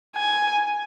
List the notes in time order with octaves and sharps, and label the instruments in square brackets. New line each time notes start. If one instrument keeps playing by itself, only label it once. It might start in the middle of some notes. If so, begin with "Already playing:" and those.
[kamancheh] G#5